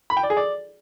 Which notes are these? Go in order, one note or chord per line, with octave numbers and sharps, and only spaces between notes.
B5
G5
D5
G#4
D5